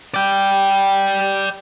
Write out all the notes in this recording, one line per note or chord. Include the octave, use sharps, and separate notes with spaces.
D5 G5